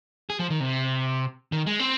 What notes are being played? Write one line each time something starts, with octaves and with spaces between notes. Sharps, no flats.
G#4
F3
D#3
C3
D#3
G#3
C4